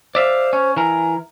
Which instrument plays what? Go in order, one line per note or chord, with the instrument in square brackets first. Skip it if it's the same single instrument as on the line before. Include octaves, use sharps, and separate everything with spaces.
[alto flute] C5 [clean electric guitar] D5 E5 F5
[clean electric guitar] C#4
[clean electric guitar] E3 A#4 [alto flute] G#5